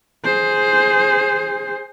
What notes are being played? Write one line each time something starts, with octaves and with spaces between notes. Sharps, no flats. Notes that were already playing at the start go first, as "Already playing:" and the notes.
G#4 C5